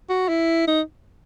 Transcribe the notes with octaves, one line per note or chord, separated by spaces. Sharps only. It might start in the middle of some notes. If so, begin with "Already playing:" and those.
F#4
E4
D#4